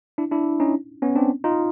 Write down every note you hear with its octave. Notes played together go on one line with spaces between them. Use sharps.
D4 E4
D4 E4
C#4 D#4
B3 C#4
C4 D4
D#4 F4